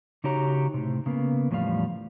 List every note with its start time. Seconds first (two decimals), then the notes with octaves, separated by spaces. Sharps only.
0.24 C#3 D#4 F#4 G4 C#5 A#5
0.74 A2 C3
1.06 C#3 A#3 B3
1.51 E2 A2 F3 G3 F5